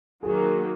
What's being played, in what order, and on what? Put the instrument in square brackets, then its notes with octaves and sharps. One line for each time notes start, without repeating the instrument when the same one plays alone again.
[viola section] D#3 F#3 A#3 F#4 [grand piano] G#4